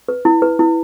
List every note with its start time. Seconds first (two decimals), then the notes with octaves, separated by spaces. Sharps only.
0.09 B4
0.25 E4
0.42 B4
0.59 E4